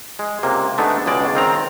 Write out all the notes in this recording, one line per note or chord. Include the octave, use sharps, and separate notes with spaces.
G#3
C#2 C3 A#3
D3 G#3 A3 B3 D4 D#4
C#2 B2 G#3 D5 A5
C#2 D#3 C4 A#5